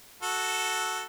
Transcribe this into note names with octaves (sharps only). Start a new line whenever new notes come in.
F#4 A4